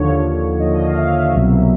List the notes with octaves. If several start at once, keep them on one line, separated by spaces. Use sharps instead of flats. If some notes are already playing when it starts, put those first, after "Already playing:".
Already playing: D#2 D3 F3 C#5
D#2 D3 F3 D#5
F5
E5
C2 B2 F#3